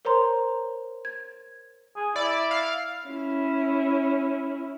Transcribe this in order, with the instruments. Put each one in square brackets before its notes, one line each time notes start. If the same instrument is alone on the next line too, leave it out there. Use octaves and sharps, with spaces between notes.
[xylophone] A#4 C5 C#5 A#5 C6
G#6
[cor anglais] G#4
[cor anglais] E4 [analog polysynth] D5
[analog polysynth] F5
[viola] C#4 E4